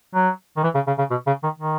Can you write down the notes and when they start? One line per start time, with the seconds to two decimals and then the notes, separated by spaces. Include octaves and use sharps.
0.14 F#3
0.57 D#3
0.63 E3
0.75 C#3
0.87 C#3
0.98 C#3
1.11 B2
1.27 C#3
1.43 D#3
1.59 D#3